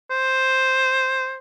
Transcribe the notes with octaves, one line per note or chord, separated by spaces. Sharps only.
C5